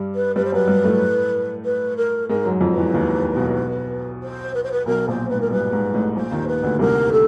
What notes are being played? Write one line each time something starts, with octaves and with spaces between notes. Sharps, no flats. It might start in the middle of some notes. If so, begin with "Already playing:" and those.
Already playing: G2 G3
B4
G2 G3 B4
C5
F#2 F#3 B4
G2 G3
A2 A3
B4
A#4
G#2 G#3 A#4
F#2 F#3
F2 F3
B4
E2 E3
D#2 D#3
B1 B2
C5
B4
C5
B4
B1 B2 A#4
A#1 A#2 C5
G#2 B4
A#4
G2 B4
G#2
A1 A2
A#1 A#2 C5
D#2 D#3
B4
D2 D3
C2 C3 A#4
A4